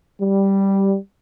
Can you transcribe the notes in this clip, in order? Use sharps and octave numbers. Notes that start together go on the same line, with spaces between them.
G3